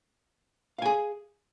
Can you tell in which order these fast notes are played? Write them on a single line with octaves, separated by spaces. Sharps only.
F5 G#5 G#4